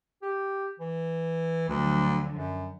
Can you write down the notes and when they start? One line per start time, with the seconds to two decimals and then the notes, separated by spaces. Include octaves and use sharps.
0.22 G4
0.80 E3
1.69 D2 D3 F3 F#3
2.36 F#2